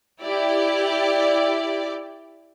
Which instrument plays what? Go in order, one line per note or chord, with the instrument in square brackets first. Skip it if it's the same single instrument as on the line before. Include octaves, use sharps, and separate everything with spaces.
[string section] E4 G4 D5